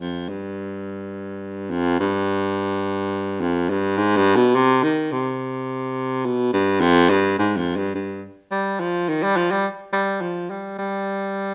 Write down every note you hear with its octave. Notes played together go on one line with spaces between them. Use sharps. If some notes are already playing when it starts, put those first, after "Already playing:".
F2
G2
F2
G2
F2
G2
G#2
G2
B2
C3
D#3
C3
B2
G2
F2
G2
G#2
F2
G2
G2
G3
F3
D#3
G3
F3
G3
G3
F3
G3
G3